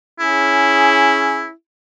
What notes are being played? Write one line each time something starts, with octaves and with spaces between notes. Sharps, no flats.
C#4 E4 G#4